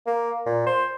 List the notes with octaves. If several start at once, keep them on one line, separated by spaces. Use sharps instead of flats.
A#3
A#2
C5